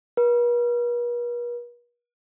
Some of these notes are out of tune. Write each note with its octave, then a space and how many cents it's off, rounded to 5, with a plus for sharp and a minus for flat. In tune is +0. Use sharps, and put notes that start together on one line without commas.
B4 -45